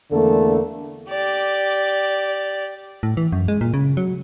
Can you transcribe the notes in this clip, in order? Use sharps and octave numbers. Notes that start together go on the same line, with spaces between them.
E2 D3 A3 A#3 A4
G4 D5
A2
E3
F#2
G#3
A#2
C#3
F#3